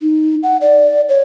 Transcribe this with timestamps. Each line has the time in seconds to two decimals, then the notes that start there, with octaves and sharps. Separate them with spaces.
0.01 D#4
0.43 F#5
0.61 D5
1.09 C#5